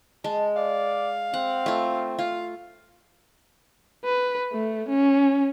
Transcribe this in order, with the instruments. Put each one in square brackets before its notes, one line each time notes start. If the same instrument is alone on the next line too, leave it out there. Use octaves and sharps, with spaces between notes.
[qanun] G#3 [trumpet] A5
[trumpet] D5 [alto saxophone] F5
[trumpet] C4 [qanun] F#5
[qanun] A3 F4
[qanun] F4 [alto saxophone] F5
[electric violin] B4
A3
C#4